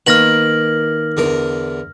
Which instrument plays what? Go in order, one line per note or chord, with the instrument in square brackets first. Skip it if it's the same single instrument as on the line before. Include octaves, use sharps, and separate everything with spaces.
[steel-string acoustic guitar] D#3 A#3 [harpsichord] B4 [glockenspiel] F6 A#6 F#7
[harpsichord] E2 D3 A#4